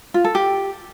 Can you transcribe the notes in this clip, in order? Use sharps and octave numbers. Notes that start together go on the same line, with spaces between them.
F4
A4
G4